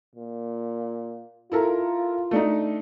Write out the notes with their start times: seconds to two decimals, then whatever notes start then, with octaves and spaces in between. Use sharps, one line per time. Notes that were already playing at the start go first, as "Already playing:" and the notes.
0.15 A#2
1.52 E4 F4 A4 A#4
2.31 A3 D4 D#4